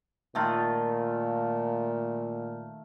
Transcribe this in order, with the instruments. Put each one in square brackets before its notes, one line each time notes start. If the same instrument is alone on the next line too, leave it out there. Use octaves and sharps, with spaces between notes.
[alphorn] A#2 [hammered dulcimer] D#3 A3 F4